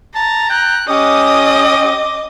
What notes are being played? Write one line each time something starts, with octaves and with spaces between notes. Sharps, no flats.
A5 A#5
G5 F#6
C#4 G4 D#5 D6 D#6